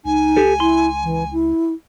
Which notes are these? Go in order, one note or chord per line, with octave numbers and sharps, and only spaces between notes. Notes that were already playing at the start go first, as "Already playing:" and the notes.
C#2 D#4 G#5
G4 A4
E4 C6
E3
E4